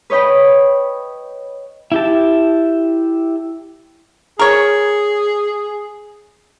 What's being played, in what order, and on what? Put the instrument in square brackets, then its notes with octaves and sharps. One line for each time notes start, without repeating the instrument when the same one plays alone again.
[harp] B4 C#5 D#5 G5 B5
[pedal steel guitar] E4 G4 A5
[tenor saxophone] G#4 [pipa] A#4 C#5